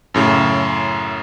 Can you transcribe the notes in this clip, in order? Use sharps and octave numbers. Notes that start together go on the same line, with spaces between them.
F#2 A2 C#3